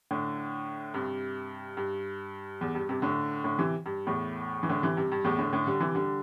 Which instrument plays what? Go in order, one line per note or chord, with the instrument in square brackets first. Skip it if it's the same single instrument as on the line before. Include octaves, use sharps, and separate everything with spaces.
[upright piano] A2 D3
G2 C3
G2
E2
G2
G2 C3
A2 D3
A2 D3
C3 E3
G2
E2 A2
E3
A2 D3
C3 E3
G2 C3
G2
E2 A2
A2 D3
A2 D3
D3 G3
C3 E3
D3 G3